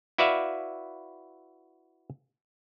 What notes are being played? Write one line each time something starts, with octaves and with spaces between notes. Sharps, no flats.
E4 F#4 B4 D5 E5 F5